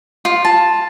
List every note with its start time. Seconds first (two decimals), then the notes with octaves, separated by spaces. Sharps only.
0.25 F4
0.45 A5